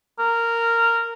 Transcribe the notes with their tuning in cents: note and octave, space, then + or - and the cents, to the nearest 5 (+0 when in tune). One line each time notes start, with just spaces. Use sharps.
A#4 -10